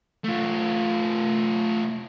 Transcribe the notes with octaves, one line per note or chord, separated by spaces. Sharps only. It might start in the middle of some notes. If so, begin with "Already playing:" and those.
A3 F4